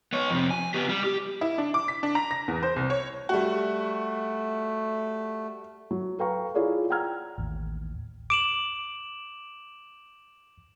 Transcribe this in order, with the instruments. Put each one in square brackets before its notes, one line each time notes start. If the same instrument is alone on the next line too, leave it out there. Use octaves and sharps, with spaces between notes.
[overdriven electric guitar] B3 C#5
F2 C3
G#5
B3 G4
G3
G4
[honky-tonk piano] E4
D4
D6
B6
D4
A#5
A#6
E2
C5
C2
C#5
[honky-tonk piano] G3 F#4 [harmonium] A3
[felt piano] F#3
A4 B4 F5 G5 A#5 C#6
E4 F4 G#4 C#5 D5 F5
F#5 G5 A#5 E6 F6 G#6
[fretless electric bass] A1 D#2
[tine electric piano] D6 [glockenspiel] D7 E7 F#7